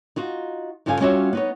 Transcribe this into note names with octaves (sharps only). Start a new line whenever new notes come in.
D#4 F4 F#4
G2 C#3 F4 A4 F5 G#5
G3 C#4 F4 F#4 C#5 E5
B3 D#4 C#5